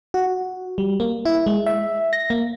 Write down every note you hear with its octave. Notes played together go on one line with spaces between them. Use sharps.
F#4
G3
A#3
E4
G#3
E5
A#6
A#3